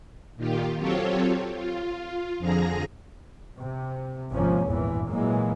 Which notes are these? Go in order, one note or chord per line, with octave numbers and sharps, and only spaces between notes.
A#2 D#3 F4 G4
F#3 C4 F4 G4 A4 C#5
F4
F2 D3 F3 G#4 A#5 A#6
C3
G#1 G#2 C3 F3 A#3 C#4
G#1 E2 G2 A#2 E3
A#2 E3 F#3 G#3 A#3